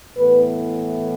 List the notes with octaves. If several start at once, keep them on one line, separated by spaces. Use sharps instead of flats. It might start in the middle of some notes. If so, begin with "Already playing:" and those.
A2 E3 B3 B4